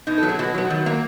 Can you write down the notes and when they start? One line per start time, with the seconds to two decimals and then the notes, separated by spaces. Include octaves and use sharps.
0.07 B2 D#4
0.18 A4
0.23 F#3 B3
0.29 G#4
0.39 B2 F#4
0.55 F#3 B3
0.70 D#3
0.86 F#3 A#3